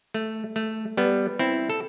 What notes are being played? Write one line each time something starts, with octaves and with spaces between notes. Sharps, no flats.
A3
A3
G3 B3
C4 E4
A4